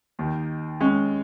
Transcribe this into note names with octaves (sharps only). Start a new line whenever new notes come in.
D#2 D#3
G#3 C#4